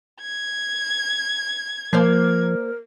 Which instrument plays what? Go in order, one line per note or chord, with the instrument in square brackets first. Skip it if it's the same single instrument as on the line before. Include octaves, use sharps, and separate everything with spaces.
[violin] G#6
[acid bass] F3 [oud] A#3 C5 D5 [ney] A#4